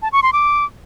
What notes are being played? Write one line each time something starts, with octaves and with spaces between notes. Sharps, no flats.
A5
C#6
C6
D6